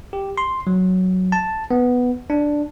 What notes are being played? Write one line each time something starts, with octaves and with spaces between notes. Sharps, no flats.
G4
C6
F#3
A5
B3
D4